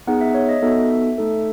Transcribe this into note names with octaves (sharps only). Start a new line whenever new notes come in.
B3 D#4 G#4 F#5
E5
C#5
D#5
B3 D#4 F#4 A4 E5
A3 D#4 A4